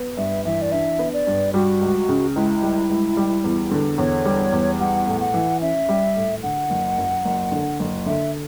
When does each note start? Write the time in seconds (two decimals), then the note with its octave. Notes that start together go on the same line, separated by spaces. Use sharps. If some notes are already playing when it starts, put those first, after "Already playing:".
Already playing: B3
0.17 G2 E5
0.45 E3 E5
0.62 D5
0.72 D4 E5
0.99 B3
1.13 D5
1.27 G2
1.54 G3 F#4
1.81 C#2
2.09 C#3
2.35 C#2 E4
2.62 G3
2.90 C#2
3.17 G3
3.44 E2
3.71 D3
3.98 E2 C#5
4.25 G3
4.52 E2
4.80 G3 F#5
5.07 A2
5.21 F#5
5.34 E3
5.61 C#4 E5
5.89 G3
6.16 A2
6.43 D3 F#5
6.70 F#1
6.98 F#2
7.25 F#1
7.52 D3
7.79 F#1
8.06 D3 E5